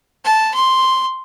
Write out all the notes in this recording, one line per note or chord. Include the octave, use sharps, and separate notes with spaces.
A5
C6